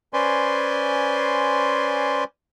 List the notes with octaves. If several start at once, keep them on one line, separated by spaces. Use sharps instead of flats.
C#4 B4 C5 D5 G#5 C6